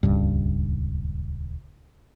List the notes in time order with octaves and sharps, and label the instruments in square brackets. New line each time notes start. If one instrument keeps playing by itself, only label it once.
[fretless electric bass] D#1 C#2 G2